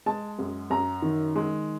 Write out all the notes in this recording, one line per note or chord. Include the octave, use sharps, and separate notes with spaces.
G#3 A5
F#2
F#2 A#5
D#3
G#3